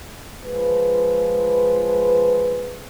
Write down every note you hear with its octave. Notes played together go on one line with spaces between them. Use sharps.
F3 G#3 B4